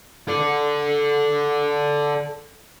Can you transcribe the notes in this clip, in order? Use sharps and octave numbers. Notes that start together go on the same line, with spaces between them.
A4 D5